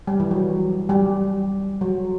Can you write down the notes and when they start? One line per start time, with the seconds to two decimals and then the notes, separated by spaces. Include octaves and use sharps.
0.07 G3
0.20 E3
0.31 F#3
0.89 G3
1.81 F#3